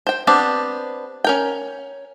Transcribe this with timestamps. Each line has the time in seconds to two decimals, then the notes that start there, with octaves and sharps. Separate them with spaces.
0.07 C5 G5
0.27 B3 C4 D4 G4
1.24 C#4 A#4 G5